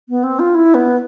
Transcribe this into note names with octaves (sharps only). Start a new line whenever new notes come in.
B3
C4
F4
E4
B3